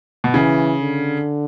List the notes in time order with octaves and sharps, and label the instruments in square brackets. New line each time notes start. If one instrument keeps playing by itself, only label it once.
[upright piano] B2
[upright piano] C#3 [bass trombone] E3
[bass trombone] D3